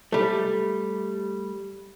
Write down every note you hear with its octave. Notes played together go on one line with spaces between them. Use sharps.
G3 A3